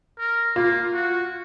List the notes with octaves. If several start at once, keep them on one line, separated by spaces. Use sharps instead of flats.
A#4
A#3 F4
F#4